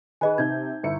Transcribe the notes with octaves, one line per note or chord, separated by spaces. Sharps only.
D#3 G#4 B4 D#5 G#5
C3 D#4 G6 G#6
G1 E4 C#7